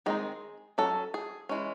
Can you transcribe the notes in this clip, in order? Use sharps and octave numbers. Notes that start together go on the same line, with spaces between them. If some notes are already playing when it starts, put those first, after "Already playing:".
D#3 G#3 C4 D#4 G#4
F#3 C#4 A4
G#4
E3 G#3 C#4